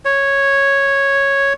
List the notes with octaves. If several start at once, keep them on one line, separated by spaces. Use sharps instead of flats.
C#5